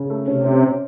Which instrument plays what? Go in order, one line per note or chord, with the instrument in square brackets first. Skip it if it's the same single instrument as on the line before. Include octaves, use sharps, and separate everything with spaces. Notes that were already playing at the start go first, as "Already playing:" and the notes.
Already playing: [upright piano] C#3
A3
[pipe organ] C3 [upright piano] C#4
[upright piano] C#4
C#4